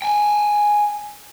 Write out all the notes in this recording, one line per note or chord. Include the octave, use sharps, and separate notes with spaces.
G5 G#5